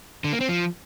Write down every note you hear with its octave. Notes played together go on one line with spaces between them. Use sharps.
D3
A#3
C4
F3